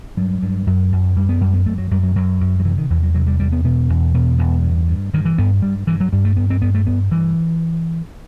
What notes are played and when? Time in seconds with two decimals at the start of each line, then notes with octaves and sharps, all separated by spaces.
0.17 G2 F#3
0.43 G2
0.67 F#2 F#3
0.92 F#2
1.16 F#2 G3
1.29 B3
1.41 F#2 G3
1.54 B3
1.66 F#2 A3
1.78 F#3
1.91 F#2 G3
2.03 F#3
2.15 F#2 F#3
2.41 F#2
2.60 F#3
2.65 C3 E3
2.78 D#3
2.90 E2 E3
3.03 F#3
3.15 C3 F#3
3.27 G3
3.39 E2 G3
3.52 B3
3.64 B2 B3
3.90 E2
4.14 B2 B3
4.38 E2 B3
4.63 G2
4.88 G2
5.14 G2 D#3
5.25 E3
5.38 G2 B3
5.62 G2 G3
5.87 G2 E3
6.00 F#3
6.12 G2 G3
6.25 A3
6.37 G2 B3
6.50 C4
6.62 G2 B3
6.75 A3
6.87 G2 B3
7.12 G2 E3